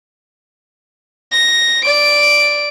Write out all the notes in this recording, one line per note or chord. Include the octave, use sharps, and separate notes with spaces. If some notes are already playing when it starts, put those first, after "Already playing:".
A#6
D5 D7